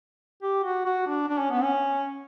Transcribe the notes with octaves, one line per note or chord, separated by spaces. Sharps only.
G4
F#4
F#4
D4
D4
C#4
B3
C#4